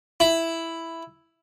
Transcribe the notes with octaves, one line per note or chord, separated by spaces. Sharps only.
E4